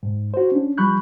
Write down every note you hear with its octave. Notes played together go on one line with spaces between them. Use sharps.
G#2
F#4 C5
C#4 D4
F3 G3 B5 C#6 F#6 G6